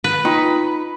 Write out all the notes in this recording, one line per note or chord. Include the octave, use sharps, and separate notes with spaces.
B4
D#4 F4 G5